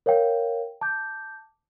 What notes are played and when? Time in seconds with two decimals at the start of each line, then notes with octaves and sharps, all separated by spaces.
0.06 A#4 C#5 F5 G5
0.81 A5 D6 G6